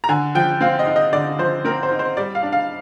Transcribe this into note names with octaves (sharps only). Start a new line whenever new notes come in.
A#5
D3 G#5
F3 G5
C4 F5
D#5
D#4
D#5
D3 D5
F3 C5
C4 A#4
C5
D#4
C5
G3 D5
F5
D4
F5